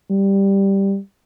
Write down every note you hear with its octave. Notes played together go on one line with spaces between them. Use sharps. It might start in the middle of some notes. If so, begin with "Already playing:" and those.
G3